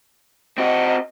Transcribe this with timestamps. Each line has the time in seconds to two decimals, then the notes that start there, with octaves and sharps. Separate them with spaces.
0.58 C4 F#4 D#5